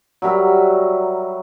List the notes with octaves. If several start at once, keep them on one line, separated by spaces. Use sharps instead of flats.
F#3 G3 A#4 E5